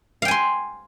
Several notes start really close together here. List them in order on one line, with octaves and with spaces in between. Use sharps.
F5 G5 G#5 C6